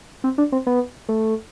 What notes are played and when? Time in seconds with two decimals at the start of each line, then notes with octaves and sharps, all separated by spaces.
0.24 C4
0.38 D4
0.52 C4
0.67 B3
1.09 A3